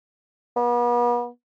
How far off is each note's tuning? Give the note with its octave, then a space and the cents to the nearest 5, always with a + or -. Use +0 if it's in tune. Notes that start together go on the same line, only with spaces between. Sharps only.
B3 -40